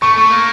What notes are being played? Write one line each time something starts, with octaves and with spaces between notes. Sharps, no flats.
A3 C#6
A3
A#3